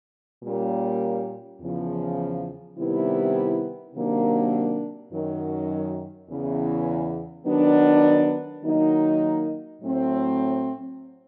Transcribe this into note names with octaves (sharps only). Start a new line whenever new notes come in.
A#2 G3 A#3 C#4
E2 C#3 F3
C3 D#3 G3 B3 E4
C3 D#3 F#3 A#3 D4
F#2 D#3 F#3
E2 C#3 E3
D#3 F#3 B3 D4
D#3 F#3 A#3 D#4
A2 F#3 A3 C4